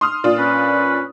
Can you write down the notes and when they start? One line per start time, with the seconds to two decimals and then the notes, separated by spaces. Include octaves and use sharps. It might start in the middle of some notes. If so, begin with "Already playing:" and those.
0.01 C6 D#6 F6
0.24 A#2 D4 F4
0.38 C#4 B4